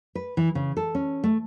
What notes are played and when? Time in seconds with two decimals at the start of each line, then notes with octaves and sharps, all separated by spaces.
0.15 B4
0.37 E3
0.55 C#3
0.77 A4
0.95 C#4
1.24 A3